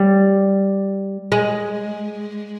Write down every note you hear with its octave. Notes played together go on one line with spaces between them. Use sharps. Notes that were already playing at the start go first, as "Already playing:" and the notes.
Already playing: G3
G#3